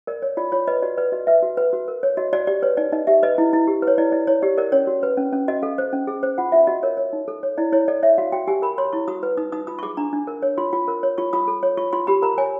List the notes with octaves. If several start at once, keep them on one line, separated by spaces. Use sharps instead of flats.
A#4 D5
C#5
F4 D5
F4 C#5
B4 D#5
F#4 D5
B4 D5
F#4 D#5
B4 E5
F#4
B4
F#4
A#4
C#5
F#4 D#5
F#4 D5
G4 D5
B4 C#5
D#4 D5
D#4 D#5
G4 E5
B4 D#5
E4
E4
G4
B4
C#5
E4 D5
E4 D5
E4 C#5
G4 D5
A#4 D5
C#4 C#5
F#4
B4
C#4
C#4
F#4 D#5
A4 F5
C5
C#4
G#4
C5
F4 F#5
F4 E5
F#4 D#5
A#4 C#5
C#5
D#4
A4
C#5
E4 D5
E4 C#5
A4 D5
C#5 E5
F#4 F5
F#4 G5
G4 G#5
A#4 B5
C#5 C6
E4 C#6
F#4 D#6
B4
D#4 D#6
D#4 D#6
F4 D#6
C#6
G#4 D6
D4 A#5
D4
A#4
C#5
F4 C6
F4
A#4
C#5
F4 C#6
F4 D#6
A4
C#5
F4 C#6
F4 C6
G4 B5
A#4 A#5
C#5 G#5